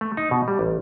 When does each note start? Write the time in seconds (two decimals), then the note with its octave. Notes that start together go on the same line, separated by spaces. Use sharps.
0.01 A3
0.17 D#4
0.31 B2
0.48 G3
0.59 A1